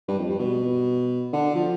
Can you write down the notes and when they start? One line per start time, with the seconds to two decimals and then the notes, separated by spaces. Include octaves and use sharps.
0.08 G2
0.19 F2
0.30 G2
0.39 B2
1.33 D3
1.54 F3